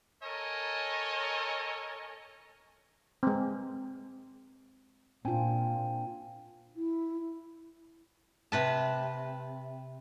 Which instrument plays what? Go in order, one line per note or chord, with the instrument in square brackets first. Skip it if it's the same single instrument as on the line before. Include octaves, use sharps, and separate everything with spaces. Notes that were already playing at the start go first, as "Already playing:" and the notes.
[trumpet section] A4 A#4 C#5 D#5 G#5 A#5
[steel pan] G#3 C4
[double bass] A#2 [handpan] C4 F4 [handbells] D4 G5 G#5
[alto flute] E4
[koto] C3 B4 A5